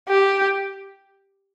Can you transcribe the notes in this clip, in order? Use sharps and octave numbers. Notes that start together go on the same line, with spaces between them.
G4